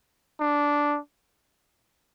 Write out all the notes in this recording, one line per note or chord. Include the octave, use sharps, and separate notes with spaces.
D4